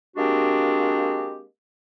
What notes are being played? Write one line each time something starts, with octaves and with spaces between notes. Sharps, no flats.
G#3 A#3 C4 D4 F#4 G4